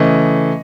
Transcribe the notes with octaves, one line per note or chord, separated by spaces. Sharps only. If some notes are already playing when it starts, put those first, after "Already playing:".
Already playing: C#3 E3 A3 D#5